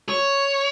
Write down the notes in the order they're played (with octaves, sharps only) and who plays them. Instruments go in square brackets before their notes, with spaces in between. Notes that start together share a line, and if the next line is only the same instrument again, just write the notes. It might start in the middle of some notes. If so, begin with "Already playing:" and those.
[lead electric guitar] C#5